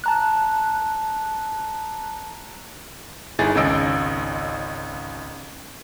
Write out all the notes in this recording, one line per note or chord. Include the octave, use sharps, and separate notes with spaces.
A5 A#5 F#6
G1 D#4 E4 G#4 A6
G#1 C#2 C#4 D#5 E6 D7